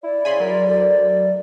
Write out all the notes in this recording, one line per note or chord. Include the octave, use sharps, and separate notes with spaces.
E4 D5
C#3 G#5 B5 C6
F#3 A#4
D2